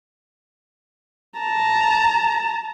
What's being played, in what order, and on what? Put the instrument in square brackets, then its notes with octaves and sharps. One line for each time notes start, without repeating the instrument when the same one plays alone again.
[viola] A5 A#5